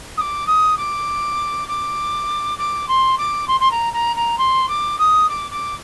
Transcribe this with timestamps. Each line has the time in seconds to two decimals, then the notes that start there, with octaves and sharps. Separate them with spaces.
0.17 D#6
0.21 D6
0.47 D#6
0.77 D6
1.68 D6
2.58 D6
2.88 C6
3.18 D6
3.48 C6
3.60 C6
3.71 A#5
3.93 A#5
4.16 A#5
4.38 C6
4.69 D6
4.99 D#6
5.29 D6
5.51 D6